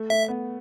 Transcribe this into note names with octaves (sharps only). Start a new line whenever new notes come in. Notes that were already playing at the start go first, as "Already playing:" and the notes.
Already playing: A3
A3 E5
B3